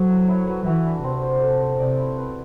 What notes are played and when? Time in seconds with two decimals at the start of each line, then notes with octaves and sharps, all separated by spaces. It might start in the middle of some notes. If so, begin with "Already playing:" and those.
Already playing: F#3 A3 C4 C5
0.09 E4
0.28 E4
0.47 B4
0.66 E3 F#4
0.84 D4
1.04 C3 C4
1.22 C5
1.42 A4
1.61 C5
1.79 C3 D5
1.99 E4
2.17 B4